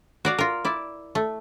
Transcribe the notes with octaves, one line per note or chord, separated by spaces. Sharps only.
F#4 D5 F5
F4 A#4
E4 D5
A3